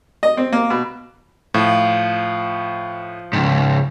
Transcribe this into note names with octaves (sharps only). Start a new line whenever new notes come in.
D#5
C4
A#3
B2
A2 F3
C#2 G#2